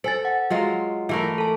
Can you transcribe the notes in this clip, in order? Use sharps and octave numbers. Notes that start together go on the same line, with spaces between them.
A4 C5 G#5 A6
F#5
F#3 G#3 F4
E3 A3 A#4
A4 A5